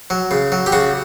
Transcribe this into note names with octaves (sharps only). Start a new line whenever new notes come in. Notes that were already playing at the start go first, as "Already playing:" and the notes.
F#3
C#3
F#3
G4
C#3 F#4